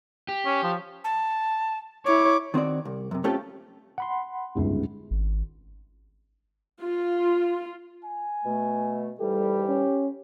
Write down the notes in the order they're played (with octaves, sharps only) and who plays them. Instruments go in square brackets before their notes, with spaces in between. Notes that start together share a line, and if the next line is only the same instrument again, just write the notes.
[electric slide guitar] G4
[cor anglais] C#4
F3
[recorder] A5
[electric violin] E4 C#5 [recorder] D6
[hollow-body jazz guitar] D#3 C4 F#4 D5
C2
F#2 C3
A3 C4 C#4 F4 G4 A4
[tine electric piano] F#5 B5 C6
[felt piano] G1 C#2 G#2
[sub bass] G#1
[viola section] F4
[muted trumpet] G#5
[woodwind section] B2 A3
[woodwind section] G#2 E3 G3 [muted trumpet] G4 [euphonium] A4
[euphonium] C#4